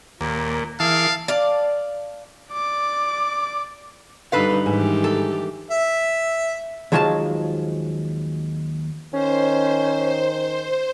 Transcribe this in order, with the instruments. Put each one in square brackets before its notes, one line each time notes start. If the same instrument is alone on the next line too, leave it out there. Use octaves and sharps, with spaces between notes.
[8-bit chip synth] D#2 [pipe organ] A#2 [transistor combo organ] A#3
[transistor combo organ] E3 [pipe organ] G#4 A#4 [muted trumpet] F5 [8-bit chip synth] A5
[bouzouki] D5 F5 A5
[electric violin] D5 D6
[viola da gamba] G2 D3 D#4 [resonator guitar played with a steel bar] A4 B4 F5
[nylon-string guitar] G#2 [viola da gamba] D#3 E3 G4
[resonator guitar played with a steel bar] A4
[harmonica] E5
[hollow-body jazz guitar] D#2 F3 F#3 G#3 F4 A5
[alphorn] D#3 [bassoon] C#4 [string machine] C5